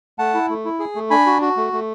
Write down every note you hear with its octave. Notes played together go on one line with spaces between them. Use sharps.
A3 F#5 A5
E4
A3
E4
G#4
A3
D4 G#5 B5
F#4
F#4
A3
A3